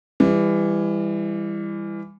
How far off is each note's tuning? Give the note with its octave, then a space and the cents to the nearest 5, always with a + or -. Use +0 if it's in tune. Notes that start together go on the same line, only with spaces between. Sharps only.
E3 +15 G3 +35